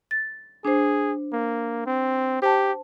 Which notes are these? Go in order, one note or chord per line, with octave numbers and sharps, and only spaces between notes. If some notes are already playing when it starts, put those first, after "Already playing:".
A6
D4 G#4 C5
A#3
C4
G4 C5 A5